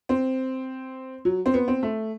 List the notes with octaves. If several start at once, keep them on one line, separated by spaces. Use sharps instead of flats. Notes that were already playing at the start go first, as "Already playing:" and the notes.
C4
F#3
C4
B3
C4
A3